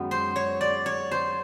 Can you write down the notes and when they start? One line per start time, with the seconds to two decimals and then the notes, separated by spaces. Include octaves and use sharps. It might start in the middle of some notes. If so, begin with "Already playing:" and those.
Already playing: F#2 D#3 G#3 B3
0.11 C5
0.36 C#5
0.61 D5
0.86 C#5
1.11 C5